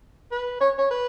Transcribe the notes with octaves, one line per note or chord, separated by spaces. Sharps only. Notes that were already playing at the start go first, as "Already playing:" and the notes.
B4
C#5
C#5
B4